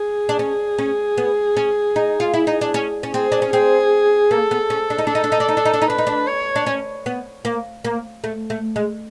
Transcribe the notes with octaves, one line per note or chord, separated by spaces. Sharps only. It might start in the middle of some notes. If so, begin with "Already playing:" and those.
Already playing: G#4
D4
C#4
C#4
B3
C#4
D#4
F4
E4
D#4
D4
C#4
C#4
C4 G#4
D4
C#4
C4 G#4
A#3 A4
B3
C#4
D4
D#4
D4
D#4 A4
D4
D#4
D4
D#4
D4
D#4
D4
D#4
D4 B4
D#4
D4
C#5
D4
C#4
B3
A#3
A#3
A3
A3
G#3